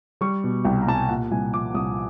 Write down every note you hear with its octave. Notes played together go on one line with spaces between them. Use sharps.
G3 C#6
B2
C2 G5
A#5
C2 A5
G#5
G5
A#2 F#5
C2 G#5
F3 D6
C2 D#6